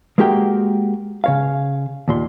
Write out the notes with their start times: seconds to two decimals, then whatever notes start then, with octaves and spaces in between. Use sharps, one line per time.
0.18 G#3 A#3 F#4 G4 A#4 G5
1.24 C#3 C#5 F5
2.08 D#2 A#2 C6